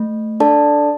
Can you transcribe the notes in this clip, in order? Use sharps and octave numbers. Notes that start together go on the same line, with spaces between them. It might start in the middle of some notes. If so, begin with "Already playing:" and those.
Already playing: A3
D4 A4 D5 A5